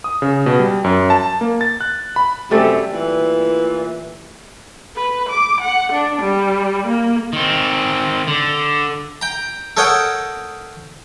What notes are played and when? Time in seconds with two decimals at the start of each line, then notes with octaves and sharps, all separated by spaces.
0.04 D#6
0.22 C#3
0.46 B2
0.60 G3
0.84 F#2
1.10 A5
1.41 A#3
1.61 A6
1.81 F#6
2.16 B5
2.51 F#2 C3 G3 A3 A4
2.92 A#2 E3
4.96 B4
5.29 D6
5.61 F#5
5.93 D4
6.22 G3
6.87 A#3
7.33 D#3 C4
8.28 D3
9.22 G5 A#5
9.77 A4 A#4 C#5 D#5 F#5 G5